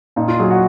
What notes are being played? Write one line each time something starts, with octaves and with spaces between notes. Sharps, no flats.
A#2 D#4
F4
F#3 G#4
F#4